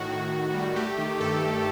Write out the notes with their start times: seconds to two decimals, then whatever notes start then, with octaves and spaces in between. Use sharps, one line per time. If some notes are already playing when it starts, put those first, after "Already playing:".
Already playing: A2 D#3 F#4
0.10 A2
0.32 A2
0.54 G3
0.76 A3 G4
0.98 D#3
1.20 G2 A4
1.42 D#3